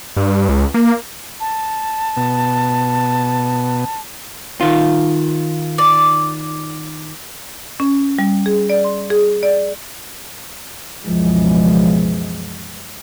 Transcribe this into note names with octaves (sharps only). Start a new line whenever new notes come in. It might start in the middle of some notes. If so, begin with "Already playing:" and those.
G2
C#2
A#3
A5
B2
D#3 F4
D5
C#4
G3
G#4
D5
C6
G#4
D5
C#2 F#2 B2 E3 F3 G#3